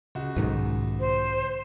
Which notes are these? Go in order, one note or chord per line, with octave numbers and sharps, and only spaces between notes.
C#2 F#4
B1 G#2 D#3
C5